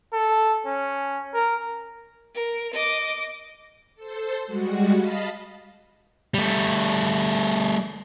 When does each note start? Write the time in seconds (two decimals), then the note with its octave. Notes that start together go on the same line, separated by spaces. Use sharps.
0.13 A4
0.66 C#4
1.34 A#4
2.35 A#4
2.74 D#5 D6
3.95 A4 C5
4.46 G3 G#3 F#4
4.93 D#5 F5 A5 B5
6.34 G3 A3